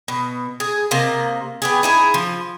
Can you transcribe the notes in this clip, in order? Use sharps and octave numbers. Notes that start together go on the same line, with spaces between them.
B2
G#4
C3 A#3 D#5
B3 G4 G#4
D#4 E4 G#4
F3